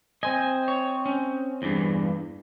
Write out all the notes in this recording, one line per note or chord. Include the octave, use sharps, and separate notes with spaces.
C4 C5 D#5 G#5
C#5
C#4
E2 G2